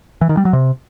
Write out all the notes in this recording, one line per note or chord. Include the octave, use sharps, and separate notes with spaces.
E3
D#3
G3
F#3
C3